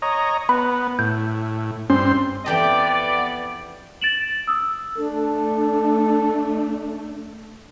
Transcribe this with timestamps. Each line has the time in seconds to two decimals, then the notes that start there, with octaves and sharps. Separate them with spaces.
0.02 C#5 D#5 A#5
0.49 B3 B5
0.99 A2 G6
1.90 G2 C4 C#4 C6
2.46 F2 E3 B3 G4 D5 G5 A5
4.02 A6 D7 E7 F#7
4.47 D#6 E6
4.98 A3 D4 A4